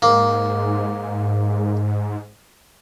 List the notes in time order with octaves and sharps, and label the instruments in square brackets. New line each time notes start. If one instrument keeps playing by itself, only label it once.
[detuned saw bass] G#2 [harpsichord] A#3